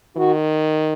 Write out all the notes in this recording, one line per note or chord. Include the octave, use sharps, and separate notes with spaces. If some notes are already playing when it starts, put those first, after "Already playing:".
D#3 F#4